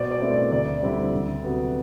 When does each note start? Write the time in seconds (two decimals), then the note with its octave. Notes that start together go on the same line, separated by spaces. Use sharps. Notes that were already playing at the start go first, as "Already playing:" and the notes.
Already playing: B2 C5 D5
0.11 D5
0.21 A3 C4 E4
0.31 D5
0.51 D2 D5
0.82 D3 G3 C4 E4
1.13 D2
1.44 C3 F#3 B3